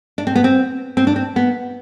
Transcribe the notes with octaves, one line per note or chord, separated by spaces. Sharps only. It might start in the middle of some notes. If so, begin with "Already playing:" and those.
D4
C4
B3
C4
C4
D4
C4
B3